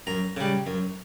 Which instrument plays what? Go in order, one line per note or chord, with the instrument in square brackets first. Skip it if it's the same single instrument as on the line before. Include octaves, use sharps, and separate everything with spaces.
[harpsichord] F#2 A#5
C#3 G3
F#2